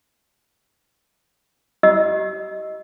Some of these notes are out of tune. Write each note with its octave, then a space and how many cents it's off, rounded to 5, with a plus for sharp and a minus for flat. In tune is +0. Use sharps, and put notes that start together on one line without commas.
G4 -40 D#5 +0 E6 +0